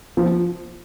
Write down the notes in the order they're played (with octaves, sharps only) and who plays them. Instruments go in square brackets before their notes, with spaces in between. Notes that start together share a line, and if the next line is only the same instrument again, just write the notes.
[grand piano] F3